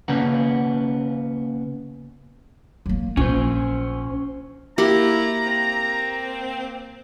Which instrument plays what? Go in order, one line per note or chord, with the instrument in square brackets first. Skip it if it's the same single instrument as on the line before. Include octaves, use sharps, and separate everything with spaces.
[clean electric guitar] C#3 A#3 B3 C#4 F#5
[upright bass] F#3 A#3
[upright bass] A#1 [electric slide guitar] C#4 C5
[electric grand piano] A#3 [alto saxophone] E4 [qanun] G4 [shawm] A#5
[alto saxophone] C4